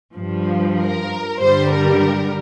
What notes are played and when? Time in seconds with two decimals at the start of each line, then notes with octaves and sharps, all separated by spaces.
0.14 G2 F3
0.77 A#4
1.40 G2 D3 G3 C5
1.72 A#4